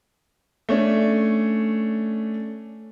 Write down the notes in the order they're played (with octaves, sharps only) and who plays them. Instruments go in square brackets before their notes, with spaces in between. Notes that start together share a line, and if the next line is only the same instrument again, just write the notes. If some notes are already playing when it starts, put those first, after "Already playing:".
[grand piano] A3 C#4 D4